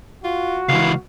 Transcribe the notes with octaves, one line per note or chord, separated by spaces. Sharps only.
F4 F#4
C#2 E3 F5